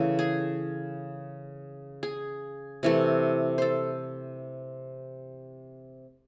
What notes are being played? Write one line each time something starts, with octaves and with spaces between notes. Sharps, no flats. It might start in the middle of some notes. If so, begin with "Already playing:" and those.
Already playing: C#3 E3 A3
G#4
G#4
C3 E3 A3
A4 C5